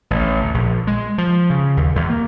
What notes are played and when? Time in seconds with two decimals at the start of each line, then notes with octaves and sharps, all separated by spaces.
0.11 A1
0.41 D2
0.54 A#1
0.87 G#3
1.18 F3
1.50 C#3
1.77 D#2
1.95 E2
2.09 A#3